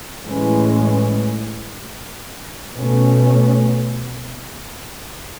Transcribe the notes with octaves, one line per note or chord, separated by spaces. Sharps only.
A2 E3 G#3 C#4
B2 A3 C#4